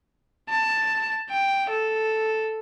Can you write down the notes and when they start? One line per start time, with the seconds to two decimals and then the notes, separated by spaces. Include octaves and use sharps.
0.49 A5
1.30 G5
1.70 A4